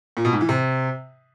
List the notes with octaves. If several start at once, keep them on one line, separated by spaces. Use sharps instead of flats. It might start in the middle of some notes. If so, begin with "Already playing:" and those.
A#2
B2
G#2
E3
C3